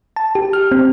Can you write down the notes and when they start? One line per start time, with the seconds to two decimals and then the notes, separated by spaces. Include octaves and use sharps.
0.16 A5
0.35 G4
0.53 F6
0.72 C4